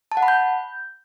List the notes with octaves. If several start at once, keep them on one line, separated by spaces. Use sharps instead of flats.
A5
F#5
B5
G6